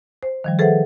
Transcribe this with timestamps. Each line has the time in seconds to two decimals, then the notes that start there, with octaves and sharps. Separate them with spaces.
0.23 C5
0.44 D#3 F3 G3
0.59 G#4 A4 B4 C5 E5 F#5